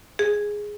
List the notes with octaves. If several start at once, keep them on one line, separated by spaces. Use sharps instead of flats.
G#4